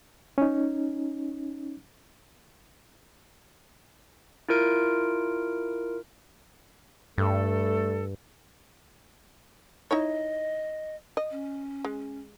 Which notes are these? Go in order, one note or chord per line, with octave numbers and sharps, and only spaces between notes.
C#4 D#4
E4 F4 A#4 D7
G2 G3 A3 A4
D#4 E4 C#5 D#5
D#5
C#4
G#3